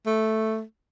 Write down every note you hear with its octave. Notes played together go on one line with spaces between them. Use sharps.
A3